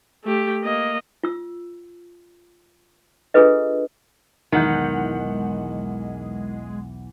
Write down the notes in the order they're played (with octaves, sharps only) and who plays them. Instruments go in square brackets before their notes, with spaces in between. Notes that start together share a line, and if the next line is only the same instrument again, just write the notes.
[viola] A3 G4
A#3 D#5
[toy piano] F4 E6
D4 F4 G#4 A4 B4 D#5
[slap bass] B1 E2 [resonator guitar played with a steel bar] D#3 [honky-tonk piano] E3 F#5 G6 [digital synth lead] G#3